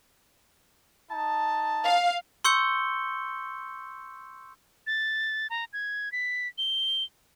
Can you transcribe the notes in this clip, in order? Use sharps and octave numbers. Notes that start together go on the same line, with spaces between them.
D#4 A5
F5
C6 C#6 E6 G6 C#7 G7
A6
A#5
G#6
B6
G7